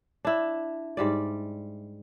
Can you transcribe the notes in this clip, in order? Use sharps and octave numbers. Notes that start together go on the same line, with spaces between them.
D4 E4
G#2 G3 D5